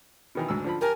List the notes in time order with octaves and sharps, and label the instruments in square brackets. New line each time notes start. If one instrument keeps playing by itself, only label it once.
[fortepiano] B2 D#3 E3
D2 G#2 E6
D3 F3 B5
[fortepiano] G4 G#5 A5 [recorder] A#4